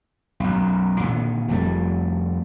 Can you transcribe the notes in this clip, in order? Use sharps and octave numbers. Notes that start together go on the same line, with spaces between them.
B1 F#2
A#2 D3 D#3
F1 F2 G3 A3